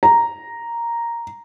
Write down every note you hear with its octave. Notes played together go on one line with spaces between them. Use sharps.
A#5